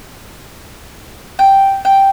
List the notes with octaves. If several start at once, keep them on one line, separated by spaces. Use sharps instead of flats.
G5
G5